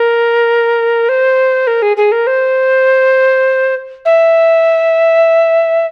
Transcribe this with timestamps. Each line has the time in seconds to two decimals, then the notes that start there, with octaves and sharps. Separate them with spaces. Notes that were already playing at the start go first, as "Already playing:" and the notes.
Already playing: A#4
1.09 C5
1.67 A#4
1.82 G#4
1.97 G#4
2.12 A#4
2.27 C5
4.05 E5